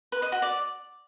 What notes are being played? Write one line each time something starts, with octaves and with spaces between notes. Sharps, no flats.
B4
D#5
F#4
D5